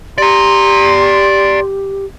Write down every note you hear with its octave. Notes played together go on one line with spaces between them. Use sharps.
G4 D5 A#5 C6